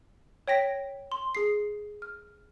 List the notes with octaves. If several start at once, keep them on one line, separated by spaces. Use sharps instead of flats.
C#5 G5 A#6 B6 D7
C6
G#4 C7
F6